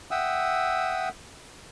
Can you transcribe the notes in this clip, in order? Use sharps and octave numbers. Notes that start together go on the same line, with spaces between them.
E5 F#5 G5 D#6 E6